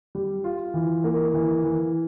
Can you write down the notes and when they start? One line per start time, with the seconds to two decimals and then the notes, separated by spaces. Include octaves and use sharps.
0.15 G3
0.44 F4
0.74 E3
1.04 A#3
1.34 E3
1.64 E3